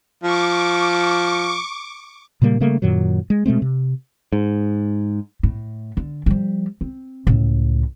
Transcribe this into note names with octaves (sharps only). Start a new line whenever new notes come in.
F3 C#6 D6
A#2 C#3 G3 A#3
C#3 G3 A3 A#3
F#2 A#2 D#3 F#3
G#3
B2 G#3 A3 C4
C3
G#2
A2
D3
F3 G3
C4
C#2 A2